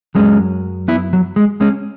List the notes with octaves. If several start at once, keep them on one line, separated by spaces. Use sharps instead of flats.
F#2 F#3 G#3 C#4
B3 E4
F#3
G#3
G#3 C#4